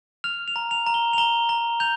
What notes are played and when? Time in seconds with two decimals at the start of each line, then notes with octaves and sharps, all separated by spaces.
0.24 F6 F7
0.48 F7
0.56 A#5
0.71 F7
0.86 A#5
0.94 G7
1.13 F7
1.18 A#5 G7
1.49 A#5 G7
1.80 G6 F7